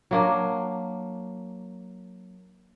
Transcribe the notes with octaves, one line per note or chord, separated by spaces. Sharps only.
F#3 A#3 D4